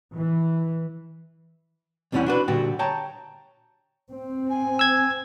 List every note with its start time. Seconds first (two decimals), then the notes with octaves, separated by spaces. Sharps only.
0.15 E3
2.12 E2 C3 G3 C#4 E4 F#5
2.26 D4 F#4 B4
2.48 A#2 D3 G3 F#4 G4
2.79 C#5 G5 A5 A#5
4.10 C4
4.49 G#5
4.79 E6 G#6